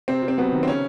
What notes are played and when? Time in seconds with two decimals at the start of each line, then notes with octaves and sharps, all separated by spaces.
0.08 C3 C4
0.22 C3
0.28 C4
0.38 F#3 B3
0.52 D#3
0.63 C4
0.67 C#3 C#4